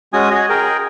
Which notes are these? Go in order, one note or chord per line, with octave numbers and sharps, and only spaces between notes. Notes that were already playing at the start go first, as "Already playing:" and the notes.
G#3 C#4 F#4 G#5 D#6
F#4 G#4 C#5 D#5
G#4 A#4 G5